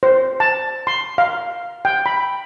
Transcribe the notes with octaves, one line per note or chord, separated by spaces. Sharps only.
C5
A5
C6
F5
G5
B5